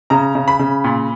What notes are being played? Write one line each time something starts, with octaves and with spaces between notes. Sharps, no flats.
C#3 A#5
C#3
B5
C#3
A#2